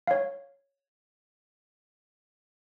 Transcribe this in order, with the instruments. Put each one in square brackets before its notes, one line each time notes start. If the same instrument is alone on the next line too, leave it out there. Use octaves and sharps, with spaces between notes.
[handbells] C#5 F5